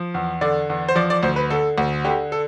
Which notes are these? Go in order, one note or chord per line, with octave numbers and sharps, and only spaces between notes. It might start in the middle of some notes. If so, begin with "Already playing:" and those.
Already playing: F3
E2
D3 D5
E2
C5
F3 D5
D5
D2 C5
B4
D3 A4
D2
D3 G4
A4